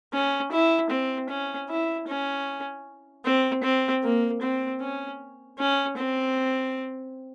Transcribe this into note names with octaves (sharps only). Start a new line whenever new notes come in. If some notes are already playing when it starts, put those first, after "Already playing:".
C#4
E4
C4
C#4
E4
C#4
C4
C4
A#3
C4
C#4
C#4
C4